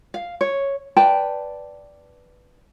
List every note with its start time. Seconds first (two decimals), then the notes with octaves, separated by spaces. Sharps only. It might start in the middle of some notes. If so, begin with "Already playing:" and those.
0.14 F5
0.41 C#5
0.97 B4 D5 G5 A5